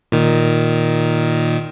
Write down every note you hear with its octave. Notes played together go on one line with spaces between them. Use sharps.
A#2 D#3